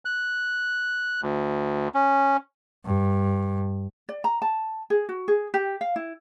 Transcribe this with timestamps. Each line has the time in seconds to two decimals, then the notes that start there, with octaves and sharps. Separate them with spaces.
0.05 F#6
1.23 D2
1.95 C#4
2.85 G2
4.09 D5
4.24 A#5
4.42 A5
4.90 G#4
5.09 F#4
5.28 G#4
5.54 G4
5.81 F5
5.96 E4